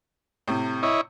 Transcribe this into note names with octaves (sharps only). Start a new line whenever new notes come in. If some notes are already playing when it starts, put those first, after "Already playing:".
A2 C3
E4 C#5 D#5